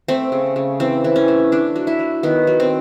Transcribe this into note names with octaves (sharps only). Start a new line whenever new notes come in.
A3 C4
C#3
C#3
E3 C4
E3
C#4
A3
A3 D4
F#3
E4
F#3
D#3 B3
F#3
C4